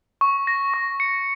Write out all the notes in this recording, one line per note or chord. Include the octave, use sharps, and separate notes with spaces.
C#6
A#6
C#6
C#7